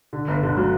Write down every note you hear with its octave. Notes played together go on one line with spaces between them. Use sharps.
D3
G1
D3
F#3